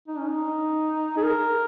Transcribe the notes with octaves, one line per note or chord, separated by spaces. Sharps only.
D#4
C#4
D#4
G#4
A#4